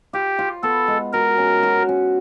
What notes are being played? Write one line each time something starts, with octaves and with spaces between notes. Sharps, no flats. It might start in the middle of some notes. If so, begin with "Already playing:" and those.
F4 G4
F4
B3 A4
G#3
F#4 A#4
C#4
F#4
C#4